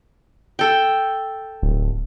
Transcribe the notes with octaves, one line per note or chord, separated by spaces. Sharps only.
A4 G5
D1